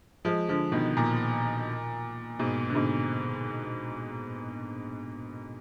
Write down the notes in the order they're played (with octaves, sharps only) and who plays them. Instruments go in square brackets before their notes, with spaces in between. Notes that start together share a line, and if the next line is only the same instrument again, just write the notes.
[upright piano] F3 G#3
D3 F3
B2 D#3
A#2
G#2 B2
D3
G#2 B2